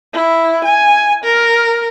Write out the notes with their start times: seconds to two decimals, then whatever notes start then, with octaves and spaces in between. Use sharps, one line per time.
0.14 E4
0.64 G#5
1.24 A#4